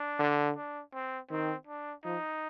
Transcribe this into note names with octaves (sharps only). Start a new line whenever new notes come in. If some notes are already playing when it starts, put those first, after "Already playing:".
Already playing: D4
D3
D4
C4
D#3 C4
D4
F3 D#4